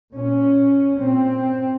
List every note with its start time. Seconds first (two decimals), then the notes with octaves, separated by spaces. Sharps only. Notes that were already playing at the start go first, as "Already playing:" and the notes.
0.14 A#2 C#4
1.00 A#2 C4